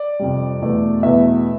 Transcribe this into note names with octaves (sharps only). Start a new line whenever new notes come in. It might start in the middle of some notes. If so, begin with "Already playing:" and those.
Already playing: D5
F2 C3 G3
E2 B2 A3
E2 B2 A3 E5